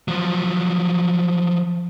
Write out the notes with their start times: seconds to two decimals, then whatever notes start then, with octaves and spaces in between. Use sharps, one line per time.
0.08 F3 F#3